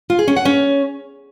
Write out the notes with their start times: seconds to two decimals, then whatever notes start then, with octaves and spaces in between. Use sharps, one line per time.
0.10 F4
0.19 G#4
0.28 C#4
0.37 F#5
0.45 C#4